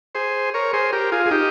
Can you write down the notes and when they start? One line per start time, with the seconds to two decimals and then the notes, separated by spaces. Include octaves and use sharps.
0.15 G#4 C5
0.54 A#4 C#5
0.73 G#4 C5
0.93 G4 A#4
1.12 F4 G#4
1.26 G#4
1.31 D#4 G4